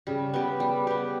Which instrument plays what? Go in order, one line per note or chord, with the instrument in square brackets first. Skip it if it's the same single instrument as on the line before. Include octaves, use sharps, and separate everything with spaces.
[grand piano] C#3 [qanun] G3
[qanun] B3 G4
G3
B3 G4